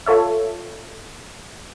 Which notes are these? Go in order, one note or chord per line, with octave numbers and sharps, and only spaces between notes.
F4 A4 C#5 E5